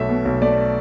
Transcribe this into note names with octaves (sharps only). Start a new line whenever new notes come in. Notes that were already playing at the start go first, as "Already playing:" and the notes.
Already playing: B1 A3 E5
B2
B1
A3 D5